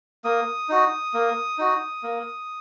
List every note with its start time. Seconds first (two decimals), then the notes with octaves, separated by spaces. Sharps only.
0.24 A#3 D#6
0.69 D#4 F#4
1.14 A#3
1.58 D#4 F#4
2.03 A#3